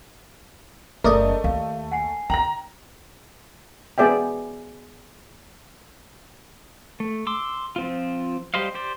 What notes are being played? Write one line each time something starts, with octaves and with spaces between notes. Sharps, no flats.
F#1 A3 A#4 D5 D#5
D#2 F5
F#5 G#5 C7
D3 G5 A#5 A#6 F#7
B3 G#4 D5 E5 G5
A3
C6 D6 E6
F3 C4 F4
G3 G4 C5 D#5 F5
G4 C5 D5